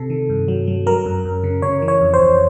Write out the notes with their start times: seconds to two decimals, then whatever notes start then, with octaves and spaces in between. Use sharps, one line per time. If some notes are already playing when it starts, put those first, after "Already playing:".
Already playing: C3 A4
0.10 D#3
0.30 G2
0.48 F#3
0.67 F#3
0.86 F#3 A#4
1.06 F#2
1.25 F#2
1.44 C#3
1.62 C#3 C#5
1.82 E3
1.88 C#5
2.01 F2
2.14 C5
2.19 F2